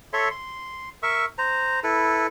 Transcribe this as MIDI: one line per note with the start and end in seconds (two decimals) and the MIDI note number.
0.13 0.29 69
0.13 0.29 73
0.13 0.29 76
0.13 0.29 84
0.31 0.89 84
1.03 1.25 70
1.03 1.25 76
1.03 1.25 85
1.03 1.25 88
1.38 1.80 72
1.38 1.80 82
1.84 2.27 64
1.84 2.27 69
1.84 2.27 71